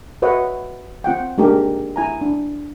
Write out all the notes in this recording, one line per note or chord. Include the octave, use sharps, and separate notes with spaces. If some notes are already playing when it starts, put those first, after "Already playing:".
F#4 B4 C#5 D#5 E5 F#5
C4 F4 F#5 G5
G#3 A#3 D4 D#4 G4 A#4
E4 G#5 A#5
D4